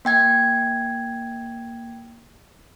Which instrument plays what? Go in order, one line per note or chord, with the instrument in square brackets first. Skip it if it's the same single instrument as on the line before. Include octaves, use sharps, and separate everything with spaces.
[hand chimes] A#3 G5 G#6